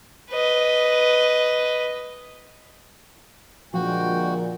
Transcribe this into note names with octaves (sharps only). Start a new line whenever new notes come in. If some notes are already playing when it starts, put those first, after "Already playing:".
B4 D#5
A#2 D3 F3 G#3 F#4 G5